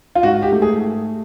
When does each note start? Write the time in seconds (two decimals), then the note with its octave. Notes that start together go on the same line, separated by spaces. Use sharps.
0.15 F4
0.23 G#2 F#4
0.42 G4
0.52 A3
0.62 G#4